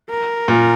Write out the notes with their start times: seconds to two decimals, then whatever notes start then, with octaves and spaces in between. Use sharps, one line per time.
0.10 A#4
0.48 A#2